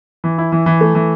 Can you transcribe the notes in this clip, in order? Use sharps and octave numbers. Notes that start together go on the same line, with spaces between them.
E3
E4
E3
E3
A3
E3